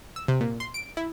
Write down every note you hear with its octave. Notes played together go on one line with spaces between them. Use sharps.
E6
C3
A#2
C6
D7
E4